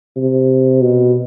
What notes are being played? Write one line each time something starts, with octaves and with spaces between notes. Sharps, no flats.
C3
B2